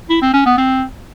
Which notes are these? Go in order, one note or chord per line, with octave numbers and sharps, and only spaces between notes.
E4
C4
C#4
B3
C4